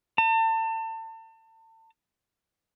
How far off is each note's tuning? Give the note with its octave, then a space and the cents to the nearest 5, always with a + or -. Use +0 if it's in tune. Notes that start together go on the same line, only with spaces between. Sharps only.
A5 +35